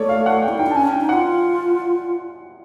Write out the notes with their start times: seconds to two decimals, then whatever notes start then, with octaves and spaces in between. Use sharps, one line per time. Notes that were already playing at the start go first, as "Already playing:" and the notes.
Already playing: A3 C#5 D5
0.09 F5
0.26 F#5
0.42 G5
0.49 E4
0.58 D#4 G5
0.66 D4
0.71 A5
0.75 C#4 G#5
0.88 D4 G5
1.01 D#4
1.09 F4 F#5